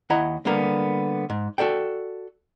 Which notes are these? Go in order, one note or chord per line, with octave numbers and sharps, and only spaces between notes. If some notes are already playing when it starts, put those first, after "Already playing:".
D#2 E4 D#5 F#5 A#5
D3 G3 A#3 B3 A#4
G#2
F#4 A4 D5 G5